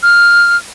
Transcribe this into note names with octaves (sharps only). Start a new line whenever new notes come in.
F6